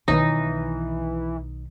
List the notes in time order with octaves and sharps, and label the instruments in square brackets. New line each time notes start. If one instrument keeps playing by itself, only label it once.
[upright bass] B1 B2 [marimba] D#3 [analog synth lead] E3 [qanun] D#4